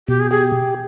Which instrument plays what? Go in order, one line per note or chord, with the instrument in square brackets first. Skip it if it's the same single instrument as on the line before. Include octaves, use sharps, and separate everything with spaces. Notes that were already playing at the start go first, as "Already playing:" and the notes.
[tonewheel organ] B2 [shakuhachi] G4
[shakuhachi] G#4
[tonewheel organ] G4 [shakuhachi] G#4